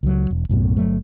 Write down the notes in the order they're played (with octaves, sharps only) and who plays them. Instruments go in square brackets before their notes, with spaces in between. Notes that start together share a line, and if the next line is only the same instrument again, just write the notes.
[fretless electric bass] C#2 F#3
E1
B1 F#2 A2 B3
G1 F#3 A3